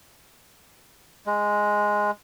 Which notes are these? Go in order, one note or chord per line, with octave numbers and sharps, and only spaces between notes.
G#3